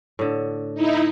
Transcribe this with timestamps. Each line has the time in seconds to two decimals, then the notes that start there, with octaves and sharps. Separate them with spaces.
0.19 A2 D3
0.75 D#4 E4